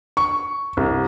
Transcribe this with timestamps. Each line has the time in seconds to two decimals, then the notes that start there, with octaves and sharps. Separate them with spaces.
0.17 C#6
0.77 C2